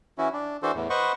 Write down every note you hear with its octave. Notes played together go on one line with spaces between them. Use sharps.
E3 C#4 E4 F#4
D4
E3 D4 F#4 A4 C5
E2 A2
B4 C5 D#5 F#5 C#6